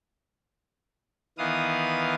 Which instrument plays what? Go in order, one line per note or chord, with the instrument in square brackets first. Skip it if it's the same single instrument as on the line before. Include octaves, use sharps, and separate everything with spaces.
[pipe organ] D#3 E3 B3 F5 D#6